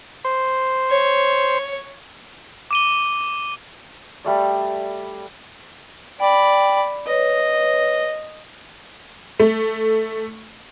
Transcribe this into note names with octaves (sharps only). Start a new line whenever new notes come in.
C5
C#5
D6 D#7 G7
G3 A3 D5
D5 G5 B5
B4 C#5 D#5
A3